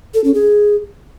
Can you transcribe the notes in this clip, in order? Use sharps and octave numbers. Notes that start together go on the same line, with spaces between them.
A4
C#4
G#4